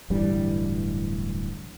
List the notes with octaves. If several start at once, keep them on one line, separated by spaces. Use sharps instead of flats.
D1 G2 E3 G3